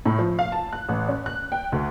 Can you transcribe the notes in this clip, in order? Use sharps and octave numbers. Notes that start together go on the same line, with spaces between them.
A2
F3
F5
A5
F#6
A1
C#4
F#6
G5
D2